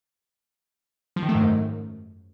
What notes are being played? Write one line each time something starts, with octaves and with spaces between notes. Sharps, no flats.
F3
D#3
A3
G#2
F#2